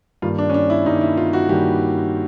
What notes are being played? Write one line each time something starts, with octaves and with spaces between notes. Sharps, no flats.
G2 D#3 G3 A#3 F4
D4
C#4
D4
E4
G2 D#3 G3 A#3 D#4
E4
F4
F#4
G2 D#3 G3 A#3 G4